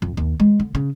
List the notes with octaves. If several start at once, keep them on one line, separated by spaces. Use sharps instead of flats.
F2
D#2
G#3
D3
C#3